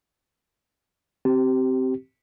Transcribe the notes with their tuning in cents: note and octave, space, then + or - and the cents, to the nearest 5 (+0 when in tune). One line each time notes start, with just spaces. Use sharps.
C4 +0 G4 -25